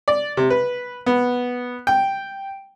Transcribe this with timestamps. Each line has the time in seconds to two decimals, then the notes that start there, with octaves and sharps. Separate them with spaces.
0.08 D5
0.37 C3
0.50 B4
1.06 B3
1.87 G5